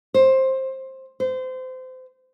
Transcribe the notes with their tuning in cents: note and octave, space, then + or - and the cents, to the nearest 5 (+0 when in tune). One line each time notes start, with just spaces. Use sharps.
C5 +15
C5 -25